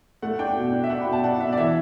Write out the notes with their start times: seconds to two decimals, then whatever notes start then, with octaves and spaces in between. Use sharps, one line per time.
0.22 A3 F#5
0.39 D4 G5
0.56 B2
0.72 D4
0.84 E5
0.90 D4 F#5
1.01 B5
1.06 B2
1.12 A5
1.24 D4 F#5
1.41 B2 E5
1.53 D5
1.57 E3 E5